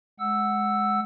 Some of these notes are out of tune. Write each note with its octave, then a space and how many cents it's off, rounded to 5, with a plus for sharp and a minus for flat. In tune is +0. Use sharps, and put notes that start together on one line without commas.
G#3 +10 F#5 +0 E6 +0